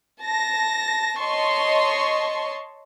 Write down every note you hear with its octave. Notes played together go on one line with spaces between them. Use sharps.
A5 A#6
C#5 D#5 A5 C6 C#6